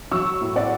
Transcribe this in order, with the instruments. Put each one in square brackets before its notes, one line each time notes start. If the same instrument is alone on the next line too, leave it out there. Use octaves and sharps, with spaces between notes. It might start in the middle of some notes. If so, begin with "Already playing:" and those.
[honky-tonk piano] F#3 C#6 E6
A2
D5 F#5